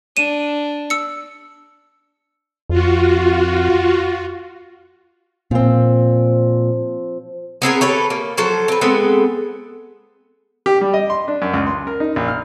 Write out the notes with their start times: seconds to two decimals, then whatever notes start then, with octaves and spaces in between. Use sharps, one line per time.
0.17 D4 D#7 E7
0.90 E6 C#7
2.70 F2 F4 F#4
5.51 A#2 F3 C4
7.62 B3 C4 G#4 A#4
7.81 G4 A4 B4 C#5
8.10 A#3
8.37 F3 F#3 A4 C5
8.68 C4 B4
8.81 G#3 B3 C4 A4
10.66 G4
10.81 G3
10.94 D#5
11.10 C6
11.28 D4
11.42 F#2
11.53 C#2
11.67 C6
11.87 A#4
12.00 D#4
12.16 A#1
12.28 F6